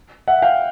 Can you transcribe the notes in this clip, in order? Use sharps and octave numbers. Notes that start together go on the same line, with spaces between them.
E5 F#5
F5 G5